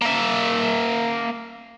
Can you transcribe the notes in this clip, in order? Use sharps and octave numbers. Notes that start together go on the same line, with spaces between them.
A#3 E5